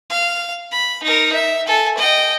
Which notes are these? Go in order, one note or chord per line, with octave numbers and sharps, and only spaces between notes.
F5
B5
D#4 A#4
E5
A4 G#5
D#5 G5